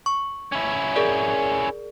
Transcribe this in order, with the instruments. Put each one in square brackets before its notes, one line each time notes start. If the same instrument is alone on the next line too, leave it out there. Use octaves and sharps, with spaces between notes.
[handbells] C#6
[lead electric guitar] C#4 E4
[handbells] G#4 A#4 D5